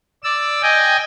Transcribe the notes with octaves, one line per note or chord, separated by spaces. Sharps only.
D5 E6
D#5 G5 G#5